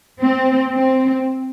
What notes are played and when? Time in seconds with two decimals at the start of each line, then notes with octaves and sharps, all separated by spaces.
0.21 C4
0.73 C4